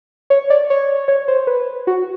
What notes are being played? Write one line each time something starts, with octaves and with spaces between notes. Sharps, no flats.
C#5
D5
C#5
C#5
C5
B4
F#4